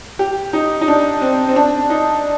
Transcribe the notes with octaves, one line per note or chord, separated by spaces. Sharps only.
G4
D#4
D#4
D4
C4
C4
D4
D#4